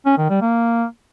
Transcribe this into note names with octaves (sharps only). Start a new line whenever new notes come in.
C#4
D#3
G3
A#3